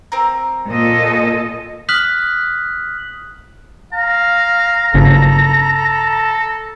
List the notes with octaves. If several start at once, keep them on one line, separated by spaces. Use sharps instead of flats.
C4 A#4
A#2 A4 D#5
D#6 F6 F#6 B6 F#7
F5 A#5
G1 C#3 A4